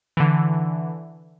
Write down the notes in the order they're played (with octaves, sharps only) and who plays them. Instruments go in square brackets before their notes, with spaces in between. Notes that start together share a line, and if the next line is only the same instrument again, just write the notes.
[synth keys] D3 E3